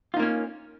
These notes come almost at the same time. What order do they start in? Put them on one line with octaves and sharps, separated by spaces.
F4 D#4 A#3 C#4